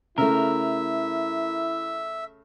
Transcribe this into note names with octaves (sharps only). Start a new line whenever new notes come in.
C#3 A3 E4 A#4 E5